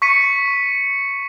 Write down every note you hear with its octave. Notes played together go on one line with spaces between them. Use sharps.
C#6 B6 C#7 D#7